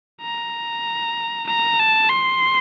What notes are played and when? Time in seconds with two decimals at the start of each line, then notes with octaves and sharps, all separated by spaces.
0.22 A#5
1.47 A#5
1.79 A5
2.09 C6